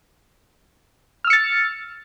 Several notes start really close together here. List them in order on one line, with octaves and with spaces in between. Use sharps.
F6 E6 C#7 A6